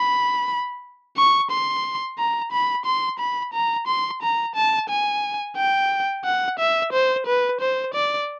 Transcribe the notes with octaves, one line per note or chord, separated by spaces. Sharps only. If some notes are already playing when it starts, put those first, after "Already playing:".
Already playing: B5
C#6
C6
A#5
B5
C6
B5
A#5
C6
A#5
A5
G#5
G5
F#5
E5
C5
B4
C5
D5